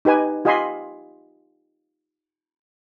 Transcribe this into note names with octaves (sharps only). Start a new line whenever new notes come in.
D#4 G4 B4 G#5
F4 G4 D#5 G#5 B5 C6